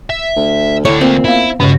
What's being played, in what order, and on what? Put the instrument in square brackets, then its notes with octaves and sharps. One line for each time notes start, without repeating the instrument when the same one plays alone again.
[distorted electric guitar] E5
[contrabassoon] D2
[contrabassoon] A2 [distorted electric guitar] D3 A3 [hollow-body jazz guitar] C#5
[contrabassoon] A#2 [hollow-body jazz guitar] C4
[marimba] B3 F5 [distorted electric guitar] E4
[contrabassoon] C#2 [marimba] G2 C#3 [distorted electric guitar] B3 F#4